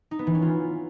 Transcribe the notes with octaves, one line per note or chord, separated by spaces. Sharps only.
D#4
B3
E3
C#4
F4